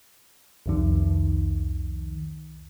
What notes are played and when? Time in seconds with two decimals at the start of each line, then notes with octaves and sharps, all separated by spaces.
0.66 C2 F2 D#3